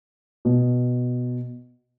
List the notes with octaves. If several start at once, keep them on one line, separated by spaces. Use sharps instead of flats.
B2